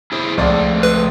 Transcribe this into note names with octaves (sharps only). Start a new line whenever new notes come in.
E4 G#4 C5
C#2 F3 A3 D5
B4